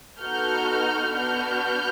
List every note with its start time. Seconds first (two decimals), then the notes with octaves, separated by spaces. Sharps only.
0.20 B3 D#4 F#4 A4 F6 G6
1.13 B3 D4 F#4 F6 G6